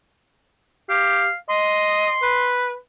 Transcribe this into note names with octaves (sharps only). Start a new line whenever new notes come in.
G4 F5
D#5 C6
B4